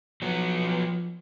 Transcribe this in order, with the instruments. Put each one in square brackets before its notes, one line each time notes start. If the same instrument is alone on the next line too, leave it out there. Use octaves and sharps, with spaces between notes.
[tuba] F3 [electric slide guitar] F#3 B3